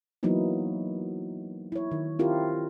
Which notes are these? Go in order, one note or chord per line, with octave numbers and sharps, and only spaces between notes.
E3 F#3 A#3 B3 D#4 E4
E4 C#5
D#3
C4 E4 F4 G4 A#4